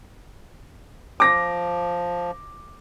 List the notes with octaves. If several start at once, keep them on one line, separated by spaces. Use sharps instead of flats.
F3 D6 A#6